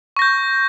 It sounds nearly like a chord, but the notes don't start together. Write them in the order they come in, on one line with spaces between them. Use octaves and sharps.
C#6 A#6 G6